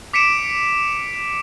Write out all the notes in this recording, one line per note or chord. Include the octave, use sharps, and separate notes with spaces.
D6 B6 C#7 D7 E7